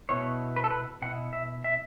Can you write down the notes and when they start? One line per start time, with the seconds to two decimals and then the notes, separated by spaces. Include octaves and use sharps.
0.09 B2 B3 E4 C#5
0.56 B4
0.64 A4
0.71 B4
1.02 B2 B3 E4 F#5
1.33 E5
1.64 E5